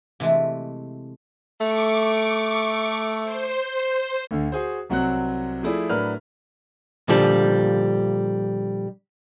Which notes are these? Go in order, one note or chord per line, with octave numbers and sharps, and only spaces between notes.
C3 E3 G#3 A3
A3 C#6 D6
C5
D2 D3
F#4 G#4 C5
C2 F#3 C4 F#5 F#6
F3 A3 E4 G#4 D5
A2 F#3 D4 A#4 B4 F6
A#2 D3 F3 G3